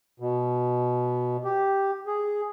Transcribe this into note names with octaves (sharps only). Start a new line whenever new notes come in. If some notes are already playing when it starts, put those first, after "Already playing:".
B2
G4
G#4